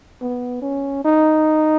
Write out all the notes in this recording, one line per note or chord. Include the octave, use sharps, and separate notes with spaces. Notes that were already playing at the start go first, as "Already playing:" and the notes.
B3
C#4
D#4